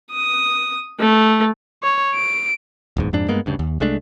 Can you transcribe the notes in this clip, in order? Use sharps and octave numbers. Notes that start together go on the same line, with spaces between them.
D#6
A3
C#5
D7
D1 E2 G#2
F2 G#2 D4
G2 G#3 A#3 B3
D2 G2 C#3
D#2
C2 G#3 A3 D4